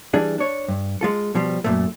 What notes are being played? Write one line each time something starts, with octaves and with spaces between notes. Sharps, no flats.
E3 G3 D4 G#4
D4 C#5
G2
G#3 F4 A4
B2 F3 G3
F#2 A#2 A3